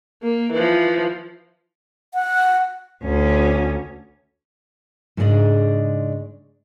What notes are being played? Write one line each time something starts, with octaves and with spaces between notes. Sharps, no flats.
A#3
E3 F3
F#5
D2 C#4
G#2 C#3 G#3 D4 D5 D#5